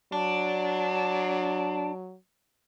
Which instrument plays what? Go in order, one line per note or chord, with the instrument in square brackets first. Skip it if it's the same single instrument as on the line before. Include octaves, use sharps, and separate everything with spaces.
[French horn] F#3 [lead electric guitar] D4